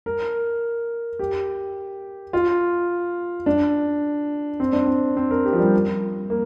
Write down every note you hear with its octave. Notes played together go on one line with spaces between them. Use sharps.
A#4
G4
F4
D4
C4
D4
C4
C4
A#4
G4
F3
G3
A#3